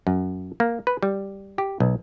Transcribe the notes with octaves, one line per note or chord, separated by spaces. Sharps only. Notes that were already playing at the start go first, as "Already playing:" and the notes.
F#2
A#3
B4
G3
G4
B1